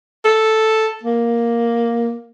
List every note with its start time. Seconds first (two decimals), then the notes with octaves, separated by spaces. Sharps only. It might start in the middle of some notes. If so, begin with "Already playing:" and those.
0.25 A4
1.03 A#3